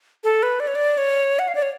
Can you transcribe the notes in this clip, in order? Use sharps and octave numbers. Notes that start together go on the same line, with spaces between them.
A4
B4
D5
C#5
D5
C#5
F#5
F5
D5
C#5